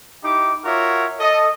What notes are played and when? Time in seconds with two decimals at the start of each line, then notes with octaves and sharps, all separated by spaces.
0.24 D#4 E4 G4 D6
0.65 F4 F#4 A#4 C#5 E5
1.20 A4 D#5